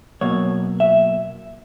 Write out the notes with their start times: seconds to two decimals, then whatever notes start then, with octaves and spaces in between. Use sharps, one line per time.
0.21 B2 F#3 A#3 C#5
0.80 E5